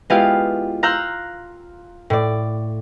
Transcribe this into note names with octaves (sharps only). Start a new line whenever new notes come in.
G#3 B3 E4 F4 G4 F5
F5 A#5 C6 E6 F#6 G6
A2 D5